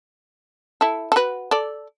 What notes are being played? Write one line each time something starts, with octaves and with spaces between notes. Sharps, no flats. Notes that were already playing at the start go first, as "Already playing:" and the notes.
E4 A4
A4
F#4 B4
A4 D5